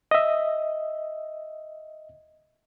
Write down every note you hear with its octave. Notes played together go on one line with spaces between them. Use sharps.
D#5 E5